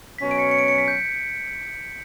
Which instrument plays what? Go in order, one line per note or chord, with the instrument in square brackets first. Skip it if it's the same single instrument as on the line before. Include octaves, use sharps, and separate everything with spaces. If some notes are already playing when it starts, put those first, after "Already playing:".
[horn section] B2 F#3 C#4 [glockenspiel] B6
[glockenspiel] D7
C#7
C#7
D7
C#7
B6
G6